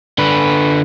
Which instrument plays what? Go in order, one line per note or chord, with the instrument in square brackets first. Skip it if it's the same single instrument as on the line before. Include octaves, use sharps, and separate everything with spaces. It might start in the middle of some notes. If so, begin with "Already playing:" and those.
[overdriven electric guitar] D3 B4